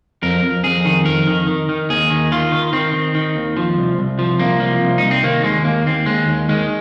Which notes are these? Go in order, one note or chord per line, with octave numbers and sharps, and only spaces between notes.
F2 A#4
F2
F2 G#4
D#3
F2 A#4
D#3
D#3
D#3
D#2 G#4
D#3
D#3 F4
D#3
D#3 C4
D#3
D#3
D#2
F3
C2
C2
F3
C2 A#3
F3
C2
C2 D#4
C4
D#3 A#3
D#2 G#3
D#2 A#3
D#2 C4
D#2 G#3
D#2
D#3 G#3